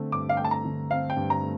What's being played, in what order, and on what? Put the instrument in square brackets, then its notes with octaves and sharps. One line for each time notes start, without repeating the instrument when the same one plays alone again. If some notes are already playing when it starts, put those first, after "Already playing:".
Already playing: [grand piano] D3 A3 C4
[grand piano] G2 [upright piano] D6
[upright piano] F5
[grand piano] A3 [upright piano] G5
[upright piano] A5
A#5
[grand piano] D3
[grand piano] C4 [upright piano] F5
[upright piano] G5
[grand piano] G2
[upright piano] A#5
[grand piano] A3